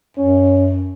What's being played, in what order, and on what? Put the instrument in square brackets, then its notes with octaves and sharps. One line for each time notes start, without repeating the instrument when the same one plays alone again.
[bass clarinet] F#2 [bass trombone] C#4